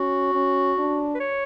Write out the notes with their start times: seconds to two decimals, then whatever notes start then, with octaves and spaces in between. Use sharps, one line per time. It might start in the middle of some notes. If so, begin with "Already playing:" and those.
Already playing: C#4 F#4
0.35 C#4
0.78 D4
1.15 B4
1.20 C#5